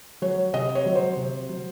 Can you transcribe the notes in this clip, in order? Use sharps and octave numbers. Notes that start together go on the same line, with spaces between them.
F#3 C#5
C3 D#5
C#5
F#3
C5
C3
F#3